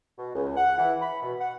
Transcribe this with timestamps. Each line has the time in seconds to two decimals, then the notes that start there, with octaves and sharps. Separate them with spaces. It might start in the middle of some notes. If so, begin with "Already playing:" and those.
0.19 B2
0.35 C#2
0.56 F#5
0.78 E3
1.01 B5
1.22 B2
1.40 F#5